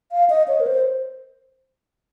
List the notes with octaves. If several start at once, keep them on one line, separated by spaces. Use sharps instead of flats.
F5
D#5
C#5
A#4
C5